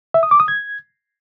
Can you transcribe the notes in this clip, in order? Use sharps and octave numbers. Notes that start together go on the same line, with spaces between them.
E5
D#6
D6
D#6
G#6